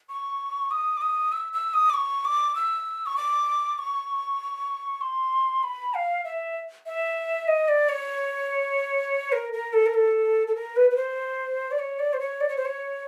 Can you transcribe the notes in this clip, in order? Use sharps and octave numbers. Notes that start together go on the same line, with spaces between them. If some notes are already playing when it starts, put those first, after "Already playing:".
C#6
D#6
D6
D#6
E6
E6
D#6
D6
C#6
D6
E6
C#6
D6
C#6
C6
B5
F5
E5
E5
D#5
D5
C#5
A#4
A#4
A4
A#4
A4
A4
A#4
B4
B4
C5
D5
C#5
D5
C5
C#5
D5
C#5
C5
C#5